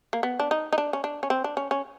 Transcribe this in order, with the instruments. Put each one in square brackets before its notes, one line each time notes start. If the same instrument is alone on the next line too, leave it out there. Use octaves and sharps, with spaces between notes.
[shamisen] A#3
B3
D4
D#4
D#4
D4
C#4
D4
C#4
C4
D4
C#4
C#4